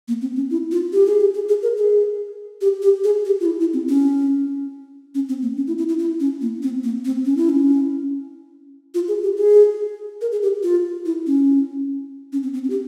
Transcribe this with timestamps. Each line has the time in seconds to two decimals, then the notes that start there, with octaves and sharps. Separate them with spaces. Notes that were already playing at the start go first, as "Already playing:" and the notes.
0.08 A#3
0.22 C4
0.36 C#4
0.50 E4
0.72 F4
0.93 G4
1.06 G#4
1.21 G4
1.34 G#4
1.49 G#4
1.63 A#4
1.77 G#4
2.61 G4
2.82 G4
3.04 G#4
3.25 G4
3.40 F4
3.46 E4
3.60 E4
3.74 C4
3.89 C#4
5.15 C#4
5.29 C4
5.42 A#3
5.57 C#4
5.67 E4
5.78 E4
5.89 E4
5.99 E4
6.20 C#4
6.41 A#3
6.63 C4
6.84 A#3
7.05 C4
7.26 C#4
7.37 E4
7.49 C#4
8.94 F4
9.08 G#4
9.23 G4
9.37 G#4
10.21 A#4
10.32 G#4
10.42 G4
10.63 F4
11.06 E4
11.27 C#4
12.33 C#4
12.43 C4
12.54 C4
12.64 C#4
12.70 G4